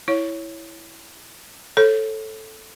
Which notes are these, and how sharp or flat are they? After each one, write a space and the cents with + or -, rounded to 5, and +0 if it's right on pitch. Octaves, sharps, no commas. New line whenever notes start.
E4 +0 C#5 +0
A4 +0 C#5 -25